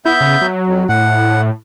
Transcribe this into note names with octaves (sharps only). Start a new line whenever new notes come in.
B3 E4 E5 G6
C#3
F#3
F2
A2 F#5